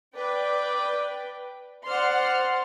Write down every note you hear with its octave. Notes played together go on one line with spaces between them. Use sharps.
B4 D5 G5
C5 D5 F#5 C6 F6